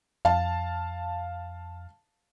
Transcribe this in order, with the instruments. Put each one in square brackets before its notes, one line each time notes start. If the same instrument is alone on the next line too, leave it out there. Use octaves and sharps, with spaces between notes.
[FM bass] F2 [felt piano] F5 A5